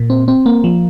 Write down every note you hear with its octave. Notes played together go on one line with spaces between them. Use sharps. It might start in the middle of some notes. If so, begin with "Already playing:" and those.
Already playing: A#2
C4
C4
A#3
F3